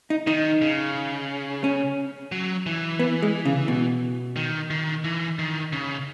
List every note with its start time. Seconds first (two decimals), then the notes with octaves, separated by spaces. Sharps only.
0.10 D#4
0.27 D#3 D#4
0.62 C#3
1.64 C#4
2.32 F#3
2.66 E3
2.99 B3
3.22 G#3
3.45 C#3
3.68 B2
4.37 D#3
4.70 D#3
5.04 E3
5.39 D#3
5.73 C#3